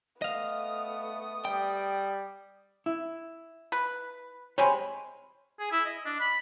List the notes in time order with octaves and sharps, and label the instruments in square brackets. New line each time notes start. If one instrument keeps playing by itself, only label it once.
[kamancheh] A3 B3 [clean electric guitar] D#5 F5 [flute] D#6
[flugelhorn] G3 [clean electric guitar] G5
[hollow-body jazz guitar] E4
[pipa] B4
[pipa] G3 G#3 C4 [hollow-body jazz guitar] C#5 G#5 B5
[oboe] G#4
E4
D#5
D4
B5